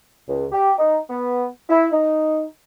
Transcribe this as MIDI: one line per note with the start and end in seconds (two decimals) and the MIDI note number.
0.28 0.45 37
0.52 0.72 67
0.79 0.98 63
1.10 1.47 59
1.70 1.87 64
1.93 2.43 63